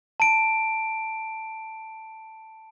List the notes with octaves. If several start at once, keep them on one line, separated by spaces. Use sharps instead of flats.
A5 D7